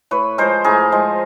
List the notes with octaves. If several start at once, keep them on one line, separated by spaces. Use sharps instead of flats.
A2 B4 C#5
F3 G#3 A#4 C5
A2 G#4 A#4
F3 G#3